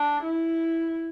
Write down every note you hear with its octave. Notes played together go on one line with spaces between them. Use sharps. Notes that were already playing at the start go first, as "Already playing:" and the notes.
Already playing: D4
E4